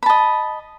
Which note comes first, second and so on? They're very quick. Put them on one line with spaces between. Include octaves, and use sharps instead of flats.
B5 A5 D#5